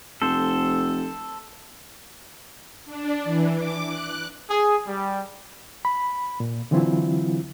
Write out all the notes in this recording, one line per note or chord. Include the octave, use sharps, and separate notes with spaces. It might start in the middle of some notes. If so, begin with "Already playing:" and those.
F1 A4 C5
D4
E3
D6
F#6
G#4
G3
B5
A#2
D3 E3 F#3 C4 E4 F4